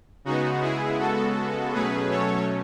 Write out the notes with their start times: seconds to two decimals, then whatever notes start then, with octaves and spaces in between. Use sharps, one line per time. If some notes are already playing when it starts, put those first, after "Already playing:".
0.25 C#3 G#3 B3 D#4 F#4
0.62 E4 G#4
0.99 F#4 A4
1.73 B2 F#3 A3 C#4 G#4 B4
2.10 A4 C#5